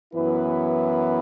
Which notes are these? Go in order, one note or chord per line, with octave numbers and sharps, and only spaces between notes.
F#2 E3 B3 E4 B4